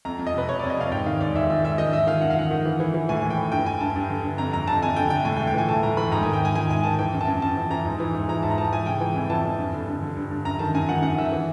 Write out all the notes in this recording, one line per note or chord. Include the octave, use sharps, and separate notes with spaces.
F2 A#5
F2
D#5
C3 B4
C3 C#5
F2 D5
D#5
C3 F5
G#2 G5
D#3 F5
G#2 D5
G#2 E5
D#3 E5
G#2 E5
D#3 D#5
D#3 E5
D#3 F5
F#2 F#5
F5
D#3 F#5
D#3
E3
E3
E3
A2 G#5
E3
G5
E3
G2 G5
G2 G#5
G2 A5
G2
D3
G2
F2 A#5
F2 A#5
D3 A5
F2 G#5
D3 G5
D3 G5
A2 G#5
G5
A2
G5
E3 G#5
A2 A5
A2 A#5
E3 B5
G#2 A#5
D#3 G#5
G5
G#2 G#5
D#3 G#5
G#2 G#5
D#3 A5
E3 G5
F#2
A5
F#2
F#2 A5
E3
E3 A#5
G#2
E3
G#2
E3 A#5
G#2 A5
A#5
G#2 A5
E3 G#5
C#3 G5
E3 G5
F2
E3 A5
F2
G2
D3
G2
D3
G2
G2
F#2 A#5
D#3 A5
F#2 G#5
D#3 F#5
F#2 F#5
D#3 E5
E3